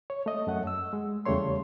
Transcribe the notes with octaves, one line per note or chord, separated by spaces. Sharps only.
C#5
A3 D#5
F#2 A3 F#5
E6
G#3
E2 C#3 G3 A3 C#5 C6